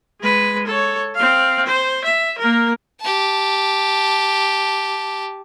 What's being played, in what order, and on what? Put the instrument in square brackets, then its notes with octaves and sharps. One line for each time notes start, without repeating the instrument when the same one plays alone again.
[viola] G#3 B4
A4 C#5
C4 F5
C5
E5
A#3 A#4
[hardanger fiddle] G4 A5